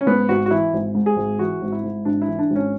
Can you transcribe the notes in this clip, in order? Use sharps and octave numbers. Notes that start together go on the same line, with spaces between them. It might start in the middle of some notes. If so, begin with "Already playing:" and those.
C#4
G#2 B3
G#1 F#4
F#4
E3 E4
G#1
G#2
G#4
G#1
E3 F#4
G#1
E4
G#2
G#1 D4
E4
E3
D4
G#1
C#4